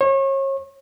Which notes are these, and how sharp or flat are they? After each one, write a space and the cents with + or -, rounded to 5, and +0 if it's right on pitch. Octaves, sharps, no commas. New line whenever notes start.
C#5 -35